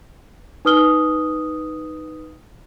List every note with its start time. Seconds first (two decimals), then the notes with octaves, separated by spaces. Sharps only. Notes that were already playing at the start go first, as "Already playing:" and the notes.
0.65 D#4 B4 D#6 F6 G7